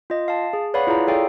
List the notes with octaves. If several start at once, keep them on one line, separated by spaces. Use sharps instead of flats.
F4 D#5
F5 A5
G#4
B4 C#5 D5 F5 F#5 B5
E4 F4 G#4 A#5
G#4 A4 C#5 D5 F5 G5